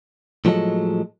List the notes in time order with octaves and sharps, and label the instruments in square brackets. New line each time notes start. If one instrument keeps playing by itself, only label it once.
[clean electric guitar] A2 F3 F#3 G#3 A4 D#5